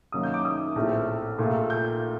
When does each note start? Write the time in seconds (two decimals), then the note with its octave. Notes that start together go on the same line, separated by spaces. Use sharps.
0.12 F#2 D#3 F#3 A#3 D#6
0.23 G6
0.34 D6
0.45 D#6
0.76 A#1 A2 A3 C4
1.39 A#1 A#2 A3
1.70 G6